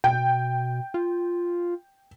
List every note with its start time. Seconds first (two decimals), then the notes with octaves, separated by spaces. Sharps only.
0.04 B2 G5
0.94 F4